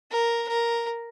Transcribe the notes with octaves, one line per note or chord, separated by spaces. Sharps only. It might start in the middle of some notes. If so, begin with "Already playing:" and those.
A#4
A#4